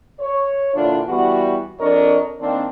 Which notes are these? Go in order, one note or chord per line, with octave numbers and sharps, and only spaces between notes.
C#5
A#2 D3 E3 D4 F4
E3 G3 B3 F#4
F2 D4 A#4 C#5 D#5
D#3 A#3 C4 D4